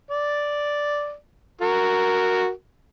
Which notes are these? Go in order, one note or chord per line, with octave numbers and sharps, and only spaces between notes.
D5
F#4 A#4